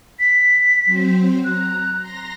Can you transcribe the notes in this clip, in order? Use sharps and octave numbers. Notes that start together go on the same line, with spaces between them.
B6
F#3 C4 C5
A#5 F#6
A#5 C6 A#6